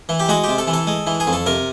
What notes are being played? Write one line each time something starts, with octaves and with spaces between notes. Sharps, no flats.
E3
G4
G#3 F#4
C3 G4
A4
E3
A4
G#3
E3
G#4
F2
A4
C3 A#4